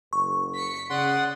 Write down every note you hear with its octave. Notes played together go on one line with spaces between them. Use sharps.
F#1 C#6
B6 C#7
C#3 D5 F#5 C6 D#6